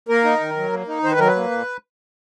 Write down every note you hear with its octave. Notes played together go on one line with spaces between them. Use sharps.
A#3 A#4
D#4
D#3
F#3
A#3
D#4
D#3 C5
B4
F#3 A#4
B4
A#3
A#2